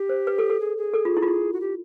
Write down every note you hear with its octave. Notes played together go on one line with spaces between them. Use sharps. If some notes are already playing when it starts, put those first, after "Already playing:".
Already playing: G4
C5
B4
A4
A4
G#4
G#4
A4
F4
E4
F4
E4
F#4
G4